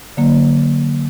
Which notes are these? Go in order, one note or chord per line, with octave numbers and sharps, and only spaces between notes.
D3 F#3 A#3